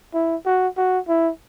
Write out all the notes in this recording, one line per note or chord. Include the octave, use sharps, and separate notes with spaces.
E4
F#4
F#4
E4